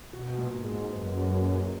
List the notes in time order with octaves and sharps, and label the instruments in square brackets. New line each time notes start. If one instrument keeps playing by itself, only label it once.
[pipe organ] B2 [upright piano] F#4
[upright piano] A#2
[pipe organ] G#2
[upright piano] G#3
[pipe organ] F#2 [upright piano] B3
[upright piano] F#4
A#2